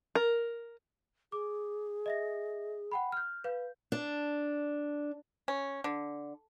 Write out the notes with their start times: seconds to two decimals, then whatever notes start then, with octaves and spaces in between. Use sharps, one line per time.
0.15 A#4
1.32 G#4 D6
2.06 D#5 E5 A#6
2.91 F#5 G5 B5
3.12 F6 G6
3.44 B4 F5 G6
3.92 D4
5.48 C#4
5.84 D3